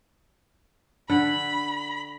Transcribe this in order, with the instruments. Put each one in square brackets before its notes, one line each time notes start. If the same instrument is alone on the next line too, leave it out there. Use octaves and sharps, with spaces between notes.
[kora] D3 F#5 [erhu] B5